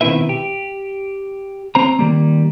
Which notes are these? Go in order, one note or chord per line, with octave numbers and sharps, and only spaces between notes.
B2 D#3 C4 E4 B4 E5
G4
C4 C5 A#5
D#3 G3 A#3